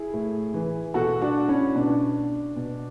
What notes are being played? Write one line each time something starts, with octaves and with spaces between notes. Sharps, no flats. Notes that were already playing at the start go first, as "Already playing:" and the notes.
Already playing: E4 G#4
A2
E3
B2 F#4 A4
D4 F#4
C#4 E4
B2 D4
B2